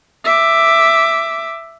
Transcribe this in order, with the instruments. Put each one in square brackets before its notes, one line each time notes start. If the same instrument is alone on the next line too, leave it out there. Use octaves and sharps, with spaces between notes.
[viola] E5 D6